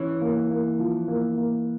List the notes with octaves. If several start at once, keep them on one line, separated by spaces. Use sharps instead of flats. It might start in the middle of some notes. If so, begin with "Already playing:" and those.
Already playing: E3 C#4
A#3
A#3
F3
A#3
A#3